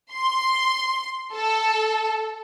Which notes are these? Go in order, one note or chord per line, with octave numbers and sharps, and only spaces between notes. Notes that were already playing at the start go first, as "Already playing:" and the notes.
C6
A4